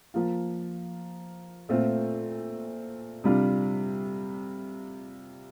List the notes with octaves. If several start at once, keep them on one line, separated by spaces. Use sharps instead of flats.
F3 A#3 F4
A#2 A3 C4 F4
C3 G3 D4 F4